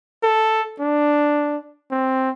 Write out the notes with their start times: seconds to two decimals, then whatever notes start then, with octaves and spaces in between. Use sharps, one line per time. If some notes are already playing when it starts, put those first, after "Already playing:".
0.23 A4
0.80 D4
1.91 C4